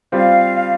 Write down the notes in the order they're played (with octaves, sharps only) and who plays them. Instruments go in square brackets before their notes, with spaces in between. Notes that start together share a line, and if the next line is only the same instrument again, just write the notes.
[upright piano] G3 C4 F4 [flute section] F5